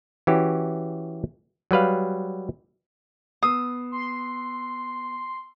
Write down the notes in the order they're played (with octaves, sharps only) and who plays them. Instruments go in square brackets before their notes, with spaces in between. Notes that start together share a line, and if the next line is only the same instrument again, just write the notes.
[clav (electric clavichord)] E3 C#4 F#4 G4
F#3 G3 B4 F5
[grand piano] B3 E6 C7 [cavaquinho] D#6
[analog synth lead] C6